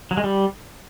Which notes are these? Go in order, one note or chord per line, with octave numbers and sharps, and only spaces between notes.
F#3
G#3
G3